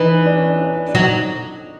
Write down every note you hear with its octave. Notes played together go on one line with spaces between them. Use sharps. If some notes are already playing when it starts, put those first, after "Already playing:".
Already playing: E3 D#4
D4
C#4
D4
D4
D4
F#3 D#4